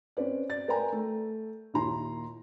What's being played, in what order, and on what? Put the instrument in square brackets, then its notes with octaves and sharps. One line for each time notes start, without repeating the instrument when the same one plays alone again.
[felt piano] C4 C#4 B4 D5
D5 A6
A#4 B4 D5 G5 G#5 A#5
A3
D#2 A#2 E4 A#5 C6